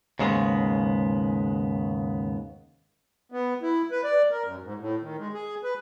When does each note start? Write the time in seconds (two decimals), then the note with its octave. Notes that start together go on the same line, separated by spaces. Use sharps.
0.19 D#2 G#2 C#3 G#3 B3
3.32 B3
3.62 E4
3.91 B4
4.04 D5
4.31 A#4
4.44 F#2
4.63 G#2
4.80 A2
5.02 D#3
5.19 G#3
5.34 G#4
5.64 B4